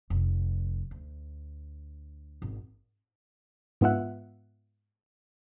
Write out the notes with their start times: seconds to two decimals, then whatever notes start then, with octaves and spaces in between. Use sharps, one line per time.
0.10 F1
0.91 D2
2.42 G#1
3.81 G#2 B3 F4 E5 F#5